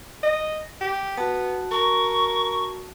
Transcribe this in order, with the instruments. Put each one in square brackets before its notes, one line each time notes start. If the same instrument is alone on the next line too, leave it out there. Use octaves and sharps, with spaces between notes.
[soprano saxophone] D#5
G4
[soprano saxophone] B3 [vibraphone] F#4 A5
[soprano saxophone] A#4 [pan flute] C#6